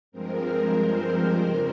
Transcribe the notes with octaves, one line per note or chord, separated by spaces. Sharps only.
G2 F3 G#3 C4 A#4
C5
A#4
F2 C#3 G3